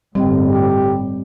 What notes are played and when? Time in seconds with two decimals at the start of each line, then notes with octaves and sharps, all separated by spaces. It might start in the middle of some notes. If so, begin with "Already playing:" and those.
0.15 G1 A2 G3 C4 D#5 G5
0.50 G4